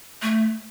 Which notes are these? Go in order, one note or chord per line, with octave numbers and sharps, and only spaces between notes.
A3